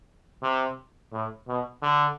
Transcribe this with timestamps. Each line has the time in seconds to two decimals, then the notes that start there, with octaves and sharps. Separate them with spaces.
0.43 C3
1.12 A2
1.48 B2
1.83 D3